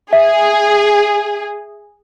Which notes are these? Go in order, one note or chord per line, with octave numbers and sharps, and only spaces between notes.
G#4 E5